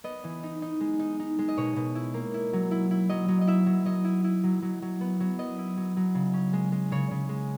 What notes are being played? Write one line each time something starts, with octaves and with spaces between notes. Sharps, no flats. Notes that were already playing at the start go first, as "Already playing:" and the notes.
B3 D#5
E3
D#4
D#4
G#3
D#4
D#4
G#3
D#5
B2 C#5
B2
E4
A#3
E4
F#3
E4
E4
F#3 D#5
F#3
D#5
E4 E5
F#3
F#3 D#5
E4
E4
F#3
F#3
F#3
B3
F#3
B3 D#5
E4
F#3
F#3
C#3
C#4
G#3
G#3
C#3 C#5
C#3
G#3